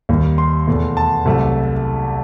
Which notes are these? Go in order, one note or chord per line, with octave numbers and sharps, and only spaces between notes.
D#2 D#3 G3
C6
E2 B2 A3
A5
C2 C3 F#3 A3